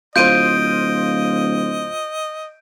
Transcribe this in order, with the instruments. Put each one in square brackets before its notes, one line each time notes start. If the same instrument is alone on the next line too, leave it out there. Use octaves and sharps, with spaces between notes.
[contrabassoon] D1 [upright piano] F4 C5 [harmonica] D#5 [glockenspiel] G6 D7 D#7